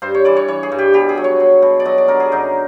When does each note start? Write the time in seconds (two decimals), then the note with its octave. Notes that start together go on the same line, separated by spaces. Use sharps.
0.02 G2 C5
0.14 C#5
0.25 E3 D5
0.37 C#5
0.48 E3 C#5
0.63 G#4
0.72 G2
0.79 G4
0.94 B2 G4
1.09 G#4
1.17 F#3
1.24 C#5
1.40 F#3
1.62 B2
1.80 D5
1.85 F#3 D#5
1.98 D5
2.08 D3 A#4
2.20 G#4
2.32 F#2 D#4